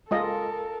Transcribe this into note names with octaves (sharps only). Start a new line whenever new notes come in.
G#3 F4 A4 A#4 D#5